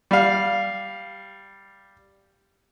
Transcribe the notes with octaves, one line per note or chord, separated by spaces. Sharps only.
G3 F5